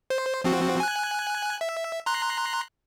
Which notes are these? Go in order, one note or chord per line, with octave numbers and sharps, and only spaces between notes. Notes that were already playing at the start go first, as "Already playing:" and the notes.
C5
F3 C4 F#4
G#5 F#6
E5
A#5 C6 F#6